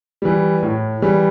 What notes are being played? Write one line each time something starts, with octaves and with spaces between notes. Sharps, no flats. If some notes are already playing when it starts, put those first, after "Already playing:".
E3 G3
A2
E3 G3